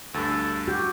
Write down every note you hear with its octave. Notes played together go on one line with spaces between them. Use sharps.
D2 G2 A4
F#4 G4 G5